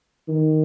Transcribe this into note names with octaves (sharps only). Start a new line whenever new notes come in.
D#3